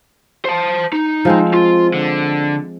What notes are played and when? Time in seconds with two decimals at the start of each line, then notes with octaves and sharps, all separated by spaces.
0.45 C5 A5
0.93 D#4
1.25 F3 G#3 C4
1.54 F4
1.93 D3